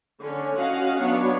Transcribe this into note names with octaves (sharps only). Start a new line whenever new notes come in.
D3 C#4
C#4 F#4 D#5 F5 F#5
F#3 B3 D4 C#5